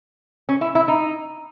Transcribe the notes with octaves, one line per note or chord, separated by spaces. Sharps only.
C#4
E4
E4
D#4